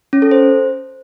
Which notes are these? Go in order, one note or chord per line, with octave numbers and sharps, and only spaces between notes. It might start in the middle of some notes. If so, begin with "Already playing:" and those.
C#4
A4
C5